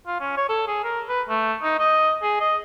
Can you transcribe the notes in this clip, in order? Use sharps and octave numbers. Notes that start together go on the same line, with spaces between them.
F4
C#4
C#5
A4
G#4
A#4
B4
A3
D#4
D#5
G#4
D#5